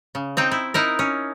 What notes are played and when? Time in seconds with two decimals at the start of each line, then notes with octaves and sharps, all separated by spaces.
0.15 C#3
0.37 C4 D#4 G5
0.51 E4
0.74 D#4 E4 A#4
0.99 C#4